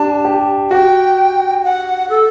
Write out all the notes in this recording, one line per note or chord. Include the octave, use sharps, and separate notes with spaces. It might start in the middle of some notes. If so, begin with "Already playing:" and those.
Already playing: D4 G4 A5
G4
F#4 G5
F#5
A4